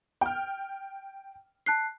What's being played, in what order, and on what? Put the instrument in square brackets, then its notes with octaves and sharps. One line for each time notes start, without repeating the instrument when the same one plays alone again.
[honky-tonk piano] G5 F6
[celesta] A5 F#6 C7